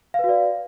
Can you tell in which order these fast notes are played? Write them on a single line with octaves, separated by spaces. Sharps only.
F5 B4 F#4 D5